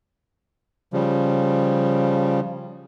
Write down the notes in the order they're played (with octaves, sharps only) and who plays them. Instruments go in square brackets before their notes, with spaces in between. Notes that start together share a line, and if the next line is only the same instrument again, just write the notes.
[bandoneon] C#3 F3 G3